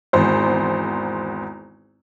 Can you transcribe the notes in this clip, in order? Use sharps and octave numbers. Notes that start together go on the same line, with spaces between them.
G#1 E2 C5